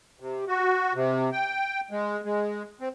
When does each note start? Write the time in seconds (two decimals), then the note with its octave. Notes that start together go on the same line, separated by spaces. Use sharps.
0.20 C3
0.48 F#4
0.94 C3
1.33 G5
1.91 G#3
2.25 G#3
2.81 C4